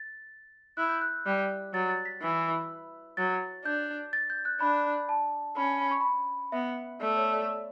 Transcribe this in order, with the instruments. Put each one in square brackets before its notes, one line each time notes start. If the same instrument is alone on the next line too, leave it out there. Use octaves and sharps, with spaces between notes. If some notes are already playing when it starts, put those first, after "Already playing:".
Already playing: [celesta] A6
[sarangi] E4 [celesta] F#6
[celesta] G6
F#6
[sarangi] G3 [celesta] F#6
[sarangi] F#3 [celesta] A6
[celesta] A6
B6
[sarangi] E3
[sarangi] F#3 [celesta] A6
[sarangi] D4 [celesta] G6
[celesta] A6
G6
F#6
[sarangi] D4 [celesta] B5
[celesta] A5
[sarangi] C#4 [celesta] B5
[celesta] B5
C#6
B5
[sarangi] B3 [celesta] E5
[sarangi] A3 [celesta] D5
[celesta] C#5
D5